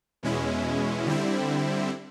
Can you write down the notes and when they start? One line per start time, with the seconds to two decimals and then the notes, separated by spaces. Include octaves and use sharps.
0.23 E2 B2 G#3 C#4 E4
1.06 D3 G3 C4 E4